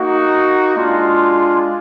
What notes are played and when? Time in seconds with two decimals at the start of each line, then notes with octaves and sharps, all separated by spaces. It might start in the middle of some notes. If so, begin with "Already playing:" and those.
Already playing: A#3 D#4 F#4
0.74 G#3 D4 F4